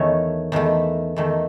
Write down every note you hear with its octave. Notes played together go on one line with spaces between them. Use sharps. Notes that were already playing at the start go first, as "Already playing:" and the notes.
Already playing: E2 D#3 A3 C#5
E2 D#3 A3
E2 D#3 A3